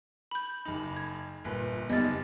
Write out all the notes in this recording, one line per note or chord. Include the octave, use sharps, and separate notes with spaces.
B5 G6
F#1 D#4 B5
G#6
G1 A#2 B4
F#1 G3 B3 D#4 D#5 A6